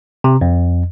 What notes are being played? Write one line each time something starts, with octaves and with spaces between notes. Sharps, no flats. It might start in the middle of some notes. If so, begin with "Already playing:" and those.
C3
F2